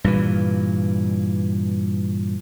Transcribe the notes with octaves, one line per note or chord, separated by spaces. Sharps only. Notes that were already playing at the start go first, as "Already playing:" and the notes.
G2 A#2 E3